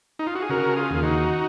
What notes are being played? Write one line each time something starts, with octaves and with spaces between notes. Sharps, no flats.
D#4
F4
F#4
G#4
C#3 F#4 A#4
F4 G#4
D#2
F4
D#4 F#4